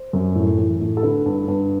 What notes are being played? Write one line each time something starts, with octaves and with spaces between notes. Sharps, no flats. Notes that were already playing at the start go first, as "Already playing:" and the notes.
Already playing: C5
F#2
A2
E3
A2
A4
D3 B4
G2
G2